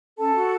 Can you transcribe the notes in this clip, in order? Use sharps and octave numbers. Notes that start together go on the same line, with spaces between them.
C#4 A4 A5
F#4